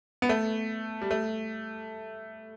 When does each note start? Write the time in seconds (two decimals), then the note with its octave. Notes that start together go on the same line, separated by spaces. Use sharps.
0.22 B3
0.29 A3
1.02 G3
1.11 A3